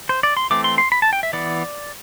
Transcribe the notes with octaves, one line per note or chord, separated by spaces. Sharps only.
C5
D5
C6
E3 A3 C4 D6
C6
C6
B5
A5
G5
E5
E3 B3 D5